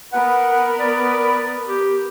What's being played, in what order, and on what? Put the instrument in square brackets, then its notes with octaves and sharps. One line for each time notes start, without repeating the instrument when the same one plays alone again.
[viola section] B3 A#4 B4 [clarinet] F#5
[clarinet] D5
G4